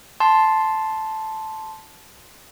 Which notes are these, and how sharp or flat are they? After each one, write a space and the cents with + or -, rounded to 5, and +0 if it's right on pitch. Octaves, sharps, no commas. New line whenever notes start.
A5 -5 C6 +0